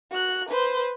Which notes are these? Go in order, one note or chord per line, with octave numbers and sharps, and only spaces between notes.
F#4 F#6
B4 C5